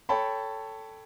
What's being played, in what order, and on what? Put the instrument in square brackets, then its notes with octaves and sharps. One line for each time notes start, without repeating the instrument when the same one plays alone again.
[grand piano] A4 C#5 G5 A5 B5